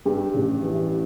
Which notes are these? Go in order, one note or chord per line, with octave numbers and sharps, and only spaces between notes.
G2 G4
A1
E3